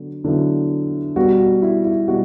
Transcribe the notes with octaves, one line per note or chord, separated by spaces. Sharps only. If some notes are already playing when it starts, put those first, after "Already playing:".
Already playing: D3 F#3 B3
D3 F#3 B3 E4
B2 G3 B3 F#4
F#4
E4
E4
B2 G3 F#4